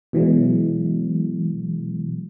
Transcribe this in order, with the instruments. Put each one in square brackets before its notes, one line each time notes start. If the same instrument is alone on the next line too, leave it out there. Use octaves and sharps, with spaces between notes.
[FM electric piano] B2 E3 F#3 G#3